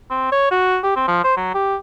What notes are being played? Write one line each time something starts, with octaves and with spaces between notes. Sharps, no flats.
C4
C#5
F#4
G4
C4
F3
C5
F#3
G4